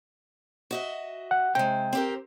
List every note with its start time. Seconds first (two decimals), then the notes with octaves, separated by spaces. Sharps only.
0.71 F#4 D#5 E5
1.31 F#5
1.55 C3 G#3 G5
1.93 C4 G4 A#4